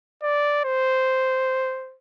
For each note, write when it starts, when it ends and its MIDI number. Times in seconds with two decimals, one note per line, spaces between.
0.23 0.60 74
0.65 1.97 72